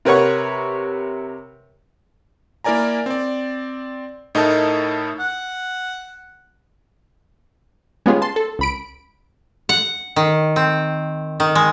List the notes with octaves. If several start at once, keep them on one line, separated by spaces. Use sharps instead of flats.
C3 A#4 B4 C#5 F#5 C#6
A#3 E4 A#4 D5 G#5 A#5
C4 D5
A2 D#4 E4 A4 A#4 A5
F#5
G#3 B3 C#4 F4 G4 G#4
A5 C6
A4
C#2 B5 D7
F#5
D#3
C4
D#3
G#3